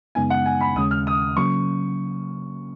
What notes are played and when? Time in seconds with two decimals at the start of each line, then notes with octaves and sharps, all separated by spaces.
0.15 F#2 C#3 G#3 B3 D#4 G#5
0.30 F#5
0.46 G#5
0.61 B5
0.76 D#2 C#3 G#3 C#4 D#6
0.91 F6
1.07 D#6
1.37 C#3 F#3 A#3 C#4 C#6